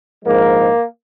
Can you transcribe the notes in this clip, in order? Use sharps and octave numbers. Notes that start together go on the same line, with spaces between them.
A#1 G#2 F3 G#3 A#3 A#4